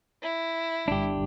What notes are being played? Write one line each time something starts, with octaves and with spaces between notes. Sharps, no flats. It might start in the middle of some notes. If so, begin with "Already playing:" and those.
E4
G1 D4 G4